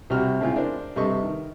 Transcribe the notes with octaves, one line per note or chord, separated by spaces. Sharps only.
C2 C3 F#4 G5 F6
A2 C#3 G#3 C4 E4 F4
D4 A#4 C5
G2 C3 G3 A4 D#5 C#6
D#3